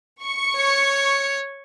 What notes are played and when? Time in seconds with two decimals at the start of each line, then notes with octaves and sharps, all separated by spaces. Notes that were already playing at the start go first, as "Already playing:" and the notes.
0.23 C#6 C#7
0.56 C#5